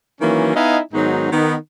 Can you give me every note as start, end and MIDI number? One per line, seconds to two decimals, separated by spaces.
0.20 0.54 51
0.20 0.54 52
0.20 0.54 54
0.20 0.54 58
0.20 0.54 61
0.55 0.78 59
0.55 0.78 63
0.55 0.78 64
0.55 0.78 75
0.55 0.78 77
0.55 0.78 80
0.93 1.30 44
0.93 1.30 51
0.93 1.30 54
0.93 1.30 59
0.93 1.30 63
0.93 1.30 66
1.31 1.56 51
1.31 1.56 59